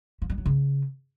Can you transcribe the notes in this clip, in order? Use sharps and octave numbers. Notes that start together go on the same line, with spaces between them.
F3
G3
F#3
C#3